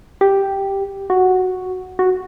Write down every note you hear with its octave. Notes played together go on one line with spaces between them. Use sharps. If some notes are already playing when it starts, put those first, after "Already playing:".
G4
F#4
F#4